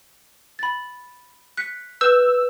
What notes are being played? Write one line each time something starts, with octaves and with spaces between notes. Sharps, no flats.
B5 A6
F#6 B6 C#7
B4 E6 G6